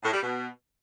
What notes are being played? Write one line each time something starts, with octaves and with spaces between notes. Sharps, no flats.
A2
G3
B2